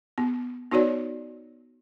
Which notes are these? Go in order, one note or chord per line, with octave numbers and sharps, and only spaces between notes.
B3
B3 D#4 F#4 C#5 D5